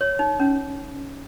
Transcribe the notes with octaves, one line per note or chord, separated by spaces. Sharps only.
C#5
D#4
C#4